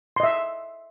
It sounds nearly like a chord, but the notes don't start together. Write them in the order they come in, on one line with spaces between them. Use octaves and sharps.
C6 D#5 E5